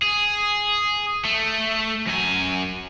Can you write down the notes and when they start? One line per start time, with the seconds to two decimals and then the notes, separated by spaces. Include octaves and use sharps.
0.02 G#4
1.25 A3
2.07 F#2 G#5